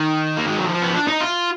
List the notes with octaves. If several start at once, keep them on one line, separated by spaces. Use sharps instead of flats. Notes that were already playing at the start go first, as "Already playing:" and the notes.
Already playing: D#3
A#3
G#3
F#3
F3
B3
D4
D#4
F4